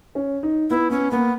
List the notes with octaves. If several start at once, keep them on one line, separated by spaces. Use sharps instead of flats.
C#4
D#4
B3 E4
B3 C#4
A#3 B3